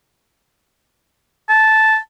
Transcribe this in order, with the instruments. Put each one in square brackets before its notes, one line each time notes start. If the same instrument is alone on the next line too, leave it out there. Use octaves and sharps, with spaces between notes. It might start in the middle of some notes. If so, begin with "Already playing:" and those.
[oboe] A5